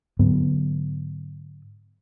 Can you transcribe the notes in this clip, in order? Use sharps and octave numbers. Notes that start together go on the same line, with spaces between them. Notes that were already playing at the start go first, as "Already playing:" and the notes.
G#2 D3 F#3 B3